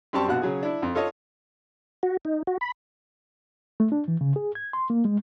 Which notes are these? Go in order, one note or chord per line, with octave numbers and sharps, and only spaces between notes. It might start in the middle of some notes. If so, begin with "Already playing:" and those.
F#2 G3 C4 G4 A5 C#6
A#1 B2 F#4 F#6
C#3 F#3 G#4
D4 E4
F2
F4 A4 C#5 D#5
F#4
D#4
F#4
B5
A3
D4
E3
C#3
G#4
G#6
C6
A#3
G#3